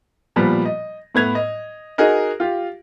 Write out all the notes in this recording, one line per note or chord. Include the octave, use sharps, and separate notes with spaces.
A#2 F3 G3 B3
D#5
A2 B3 G#6 F7
D#5
D#4 F#4 G#4 A#4 D#5
F4 G4